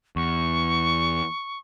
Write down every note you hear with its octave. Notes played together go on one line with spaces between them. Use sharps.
E2 C#6